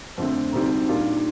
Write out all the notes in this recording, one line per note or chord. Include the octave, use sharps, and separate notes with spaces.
F2 D3 A3 C4
D2 C3 G3 C4 D#4
A#2 G3 D4 F4